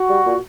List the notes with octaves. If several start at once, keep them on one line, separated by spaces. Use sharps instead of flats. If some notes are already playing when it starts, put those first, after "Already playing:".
Already playing: F#4
G3
A#2